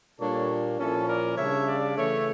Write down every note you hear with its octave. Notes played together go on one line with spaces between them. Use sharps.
A#2 G3 A#3 D4 A4 C#5
A#2 F3 C#4 E4 A4 C#5
A#4 D5
C#3 G3 D4 C#5 E5
D5 F5
C#3 E3 A3 C#4 C#5 E5